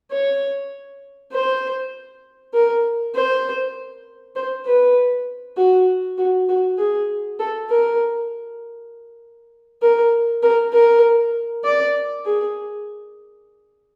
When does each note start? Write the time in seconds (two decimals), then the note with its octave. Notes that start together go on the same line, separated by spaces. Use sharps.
0.11 C#5
1.33 C5
2.54 A#4
3.15 C5
4.36 C5
4.66 B4
5.57 F#4
6.18 F#4
6.49 F#4
6.78 G#4
7.39 A4
7.70 A#4
9.82 A#4
10.43 A#4
10.73 A#4
11.65 D5
12.26 G#4